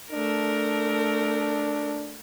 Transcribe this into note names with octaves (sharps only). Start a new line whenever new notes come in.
A3 D4 A#4